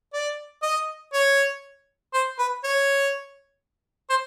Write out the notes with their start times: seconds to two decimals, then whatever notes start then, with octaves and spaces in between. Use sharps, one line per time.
0.14 D5
0.63 D#5
1.13 C#5
2.14 C5
2.39 B4
2.64 C#5
4.10 C5